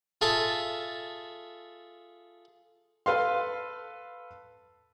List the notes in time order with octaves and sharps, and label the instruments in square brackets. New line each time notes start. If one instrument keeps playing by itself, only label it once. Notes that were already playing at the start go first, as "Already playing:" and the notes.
[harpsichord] F4 G#4 A4 E5 A5
[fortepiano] A4 B4 F5 C6